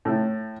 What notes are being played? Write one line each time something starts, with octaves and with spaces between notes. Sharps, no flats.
A2